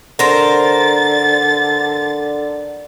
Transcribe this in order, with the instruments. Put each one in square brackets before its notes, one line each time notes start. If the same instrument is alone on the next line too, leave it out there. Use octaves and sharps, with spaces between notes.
[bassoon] D3 [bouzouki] A#4 C5 [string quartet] A6